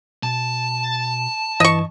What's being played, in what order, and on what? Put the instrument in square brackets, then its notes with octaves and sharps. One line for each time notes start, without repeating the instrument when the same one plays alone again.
[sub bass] B2 [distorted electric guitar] A5
[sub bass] G2 [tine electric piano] E3 [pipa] D#5 C#6